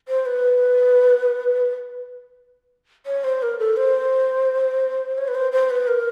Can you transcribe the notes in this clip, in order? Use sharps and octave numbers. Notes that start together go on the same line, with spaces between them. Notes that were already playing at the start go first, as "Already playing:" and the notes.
C5
B4
C#5
C5
A#4
A4
C5
C#5
B4
C5
C5
B4
A#4